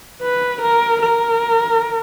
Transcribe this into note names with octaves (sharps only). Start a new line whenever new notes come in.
B4
A#4
A#4